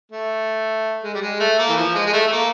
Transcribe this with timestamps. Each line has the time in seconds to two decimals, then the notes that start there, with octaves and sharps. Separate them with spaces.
0.12 A3
1.04 G#3
1.14 G3
1.22 G#3
1.40 A3
1.58 A#3
1.69 E3
1.76 F3
1.95 G#3
2.06 G#3
2.13 A3
2.27 A3
2.32 A#3